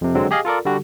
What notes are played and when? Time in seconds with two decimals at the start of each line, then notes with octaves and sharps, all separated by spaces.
0.01 F2 C3
0.15 D3 F#3 G#3 C4
0.31 G4 G#4 D#5 F5
0.45 F4 A4 A#4 D5
0.65 D3 G3 D4 F#4 G4